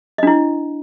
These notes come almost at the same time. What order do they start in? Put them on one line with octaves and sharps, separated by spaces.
D#5 D4 E4